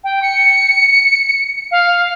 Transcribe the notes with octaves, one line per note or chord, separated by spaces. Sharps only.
G5
C#7
F5